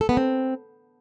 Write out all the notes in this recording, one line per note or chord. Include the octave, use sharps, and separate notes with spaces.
A4
B3
C4